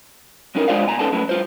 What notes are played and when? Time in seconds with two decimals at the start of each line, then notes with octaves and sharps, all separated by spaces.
0.55 F#3 C#4 D#4 A#4
0.68 G#3 D4 F4 C5 D5 F5
0.87 B2 G#5 A#5
0.99 C#4 D#4 A4 B4 F#5 A5
1.12 F#3 A3 C#4 E4 B4
1.29 G2 F4 C5